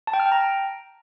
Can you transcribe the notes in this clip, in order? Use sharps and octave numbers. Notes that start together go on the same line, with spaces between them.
A5
G5
F6
G5
A#5